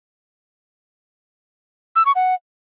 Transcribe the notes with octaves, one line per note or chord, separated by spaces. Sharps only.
E6
C#6
F#5